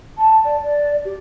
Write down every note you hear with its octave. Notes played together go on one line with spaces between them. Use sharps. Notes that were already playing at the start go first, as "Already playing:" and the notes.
A5
D5
D5
G4